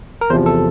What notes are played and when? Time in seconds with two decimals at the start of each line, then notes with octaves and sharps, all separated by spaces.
0.21 A#4
0.30 E2 C5
0.33 C3 F3
0.46 A4